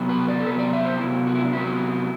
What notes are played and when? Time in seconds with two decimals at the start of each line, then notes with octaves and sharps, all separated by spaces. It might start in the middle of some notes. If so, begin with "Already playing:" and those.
Already playing: C3 F#3 B3
0.09 B4
0.28 D5
0.40 A4
0.46 C3 F#3 B3 B4
0.59 D5
0.73 E5
0.86 C5
1.00 C3 F#3 B3 E4
1.27 F#4
1.35 E4
1.45 D4
1.53 C3 F#3 B3 E4